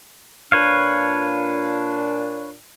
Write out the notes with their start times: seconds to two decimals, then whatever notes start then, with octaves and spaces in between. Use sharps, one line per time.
0.52 A#2 D4 B4 C#5 F5